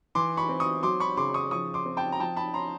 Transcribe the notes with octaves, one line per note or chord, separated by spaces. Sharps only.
E3 C6 D6
B5 C#6
C4
C#6 D#6
F#3 C6 D6
B5 C#6
C#3 C6 D6
C#6 D#6
F3 C#6 D#6
C6 D6
C4
G5 A5
A#5
F3 G5 A5
A5 B5
C#4 A#5 C6